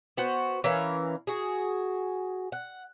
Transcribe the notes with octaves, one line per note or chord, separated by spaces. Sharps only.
B3 F#4 C5
E3 C#4 A#4 F5
F#4 G#4
F#5